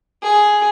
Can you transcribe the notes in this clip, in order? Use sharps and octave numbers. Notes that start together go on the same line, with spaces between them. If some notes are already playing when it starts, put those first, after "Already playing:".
G#4